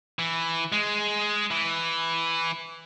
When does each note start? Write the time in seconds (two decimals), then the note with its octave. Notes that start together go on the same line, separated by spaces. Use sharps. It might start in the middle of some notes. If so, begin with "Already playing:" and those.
0.19 E3
0.72 G#3
1.51 E3